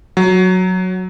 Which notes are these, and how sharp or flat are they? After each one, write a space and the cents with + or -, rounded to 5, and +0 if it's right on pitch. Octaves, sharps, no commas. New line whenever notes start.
F#3 -5